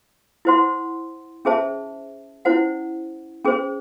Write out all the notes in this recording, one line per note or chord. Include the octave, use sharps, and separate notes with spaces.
E4 C5 F#5 C6
C#4 G#4 C5 E5 A5
C#4 E4 C5 F#5
C#4 G#4 C5